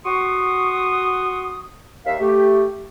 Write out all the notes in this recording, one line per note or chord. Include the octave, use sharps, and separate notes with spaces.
F#4 C6 C#6 D#6
D#2 E5 F5
A3 G4